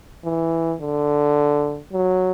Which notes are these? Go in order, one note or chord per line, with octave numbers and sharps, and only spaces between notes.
E3
D3
F#3